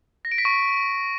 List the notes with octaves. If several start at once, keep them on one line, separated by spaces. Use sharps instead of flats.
A#6
D7
B6
C#6